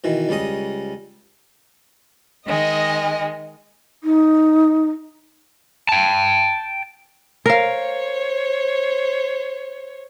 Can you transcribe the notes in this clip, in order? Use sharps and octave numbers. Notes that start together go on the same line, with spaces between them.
B2 D#3 E3
C#2 G3 C#4 D#5 D#6
D#3 G#3 D#5
D#4
G5 A5
A#4 C5 C#5 F5